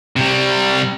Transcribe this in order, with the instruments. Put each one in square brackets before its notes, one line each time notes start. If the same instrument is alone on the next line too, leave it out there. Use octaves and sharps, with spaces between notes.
[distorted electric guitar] C3 G3